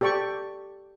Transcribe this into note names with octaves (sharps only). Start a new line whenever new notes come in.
G4 A4 D5 G5 C#6